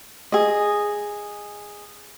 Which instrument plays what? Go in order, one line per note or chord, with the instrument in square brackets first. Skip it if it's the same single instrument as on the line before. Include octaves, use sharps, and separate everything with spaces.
[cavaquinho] G#4 D#5